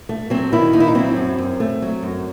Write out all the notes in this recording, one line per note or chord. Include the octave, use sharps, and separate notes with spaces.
A3
F#3 C4
D#3 E4
D#2 D#4
E4
D#4
F#3 C4
F#2
F#2
A3
F#3
F#2